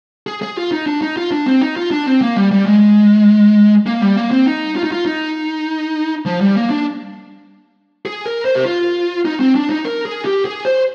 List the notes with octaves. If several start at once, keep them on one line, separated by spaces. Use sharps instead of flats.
G#4
G#4
F4
D#4
D4
D#4
F4
D4
C4
D#4
F4
D4
C4
A#3
G3
G3
G#3
A#3
G3
A#3
C4
D#4
F4
D#4
F4
D#4
F3
G3
A#3
D4
G#4
A#4
C5
G4
F4
D#4
C4
D4
D#4
A#4
G#4
G4
G#4
C5